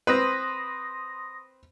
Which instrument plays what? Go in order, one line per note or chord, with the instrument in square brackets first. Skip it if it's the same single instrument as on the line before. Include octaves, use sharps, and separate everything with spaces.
[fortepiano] C4 B4 [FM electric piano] C6 D#6 A#6